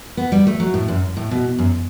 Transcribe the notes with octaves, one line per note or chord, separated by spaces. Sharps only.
B3
G3
A3
F#3
A2
F#2
A2
B2
F#2